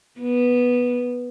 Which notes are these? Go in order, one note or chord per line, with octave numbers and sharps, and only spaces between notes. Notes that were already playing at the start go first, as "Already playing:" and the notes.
B3